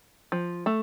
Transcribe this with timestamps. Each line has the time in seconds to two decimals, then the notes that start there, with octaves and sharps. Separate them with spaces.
0.32 F3
0.66 A3